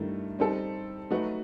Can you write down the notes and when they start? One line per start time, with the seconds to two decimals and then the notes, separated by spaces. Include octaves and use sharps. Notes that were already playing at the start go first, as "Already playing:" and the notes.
Already playing: G2 D#3 A3 E4
0.39 G3 C4 D#4 A4
1.11 F#3 A3 D#4 F#4 B4